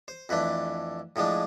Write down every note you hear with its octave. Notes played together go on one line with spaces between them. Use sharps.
C5
F2 E3 A3 D4 B4
A2 F3 G#3 D4